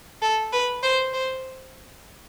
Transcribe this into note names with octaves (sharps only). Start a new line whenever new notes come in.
A4
B4
C5
C5